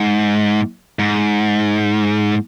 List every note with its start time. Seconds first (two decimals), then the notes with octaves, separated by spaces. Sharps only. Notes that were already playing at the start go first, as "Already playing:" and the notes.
Already playing: G#2
0.99 G#2